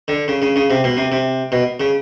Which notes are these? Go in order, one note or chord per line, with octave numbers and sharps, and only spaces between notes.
D3
C#3
C#3
C#3
C3
B2
C3
C3
B2
C#3